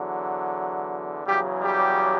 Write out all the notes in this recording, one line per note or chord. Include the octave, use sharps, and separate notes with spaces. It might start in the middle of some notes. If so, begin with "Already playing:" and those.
Already playing: E2 D3 F#3
E2 C#3 F#3 G3 G4
G3 G4